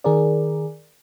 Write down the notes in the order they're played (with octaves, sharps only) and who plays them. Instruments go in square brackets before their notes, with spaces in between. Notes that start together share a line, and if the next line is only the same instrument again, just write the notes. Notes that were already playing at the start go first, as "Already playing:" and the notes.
[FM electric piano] D#3 G#4 A#4 D5